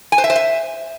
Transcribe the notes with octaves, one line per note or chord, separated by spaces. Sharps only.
G#5
C5
E5
C5
E5